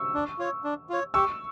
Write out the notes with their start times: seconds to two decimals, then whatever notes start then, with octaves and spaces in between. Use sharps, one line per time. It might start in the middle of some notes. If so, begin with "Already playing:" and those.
Already playing: C#6 E6
0.14 D4
0.39 F4 C#5
0.64 D4
0.89 F4 C#5
1.14 G4 C#6 E6